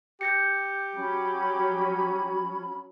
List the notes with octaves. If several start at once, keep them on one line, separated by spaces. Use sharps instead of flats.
G4 G6 A#6 C#7
F#3 C#4 B5